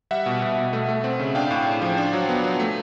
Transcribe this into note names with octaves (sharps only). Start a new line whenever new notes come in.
G3 E5 F#5
B2
B2
B2
A3
A3
C4
C#3
D4 F5 G5
A2
D4
F3
D4
F#3
B3
F#3
A3